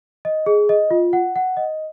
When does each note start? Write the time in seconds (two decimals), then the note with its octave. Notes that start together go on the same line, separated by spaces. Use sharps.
0.25 D#5
0.46 G#4
0.69 D#5
0.91 F4
1.13 F#5
1.36 F#5
1.57 D#5